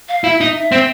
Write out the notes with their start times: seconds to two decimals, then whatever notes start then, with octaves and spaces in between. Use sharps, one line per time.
0.09 F5
0.24 E4 E5
0.41 D#4
0.55 E5
0.72 C4